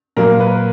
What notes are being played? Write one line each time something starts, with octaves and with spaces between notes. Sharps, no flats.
A#2 F#3 A#3 A#4
B4